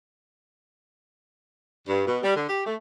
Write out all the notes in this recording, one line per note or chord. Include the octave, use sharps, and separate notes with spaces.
G2
B2
G3
D3
G4
A3